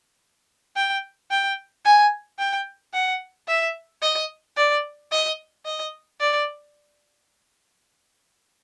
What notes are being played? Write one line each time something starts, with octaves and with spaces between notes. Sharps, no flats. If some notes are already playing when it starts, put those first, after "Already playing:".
G5
G5
G#5
G5
F#5
E5
D#5
D5
D#5
D#5
D5